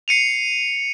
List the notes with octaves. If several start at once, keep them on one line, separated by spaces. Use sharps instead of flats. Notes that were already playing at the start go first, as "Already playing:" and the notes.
C7 C#7 D#7 F7